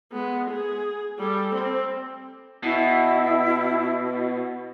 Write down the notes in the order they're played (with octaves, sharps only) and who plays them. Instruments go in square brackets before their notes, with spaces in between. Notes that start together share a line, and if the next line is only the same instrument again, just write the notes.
[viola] G#3 B3
G#4
G3 A4
C4
[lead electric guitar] B2 [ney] E4